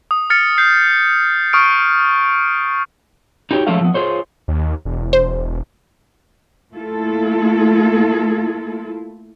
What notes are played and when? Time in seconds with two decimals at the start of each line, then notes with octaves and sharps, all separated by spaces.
0.11 D#6
0.30 F6 A6 C#7
0.58 G6 C7
1.53 C#6 D#6 F6 D7
3.51 D#4 F#4 G4 C#5
3.67 F3 G#3 A3 C#4 A4 F5
3.81 F3 B3
3.94 F4 G#4 C5 C#5
4.48 D#2
4.85 E1
5.13 C5
6.72 A3 A#3 E4 F4 A4